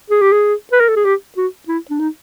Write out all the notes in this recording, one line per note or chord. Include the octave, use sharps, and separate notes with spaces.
G#4
G4
G#4
B4
A#4
A4
G#4
G4
F#4
E4
D4
D#4